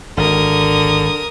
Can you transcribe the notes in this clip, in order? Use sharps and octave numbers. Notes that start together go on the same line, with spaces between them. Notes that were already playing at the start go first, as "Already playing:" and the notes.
G#1 D3 A#4 D#6